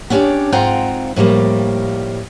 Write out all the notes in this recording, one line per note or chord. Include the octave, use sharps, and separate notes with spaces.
B3 C#4 D4 G4 C#5
G#2 C4 F4 F#5 G5 A#5
A2 F3 G3 A#3